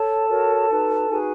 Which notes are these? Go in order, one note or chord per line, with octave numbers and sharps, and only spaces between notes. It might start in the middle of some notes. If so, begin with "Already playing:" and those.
Already playing: A4 C#5 A5
F#4 A#4 C#5
D#4 F#4 B4
D#4 F#4 G#4 B4 G#5